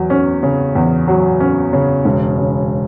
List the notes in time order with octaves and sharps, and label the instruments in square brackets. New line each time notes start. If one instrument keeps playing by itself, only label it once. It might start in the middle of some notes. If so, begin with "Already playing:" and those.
Already playing: [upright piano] E2 F#3
C#4
C#3
E2
F#3
C#4
C#3
E1
C#3